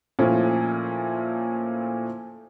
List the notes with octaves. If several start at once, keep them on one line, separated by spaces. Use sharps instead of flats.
A#2 F3 A3 C#4 E4